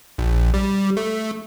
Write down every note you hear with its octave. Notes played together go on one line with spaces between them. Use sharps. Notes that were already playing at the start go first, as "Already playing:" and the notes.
A#1
G3
A3